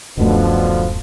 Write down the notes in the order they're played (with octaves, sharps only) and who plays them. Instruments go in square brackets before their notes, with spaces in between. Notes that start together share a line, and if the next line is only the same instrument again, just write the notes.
[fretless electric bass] D1 F#2 A3 [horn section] B2 D3 F3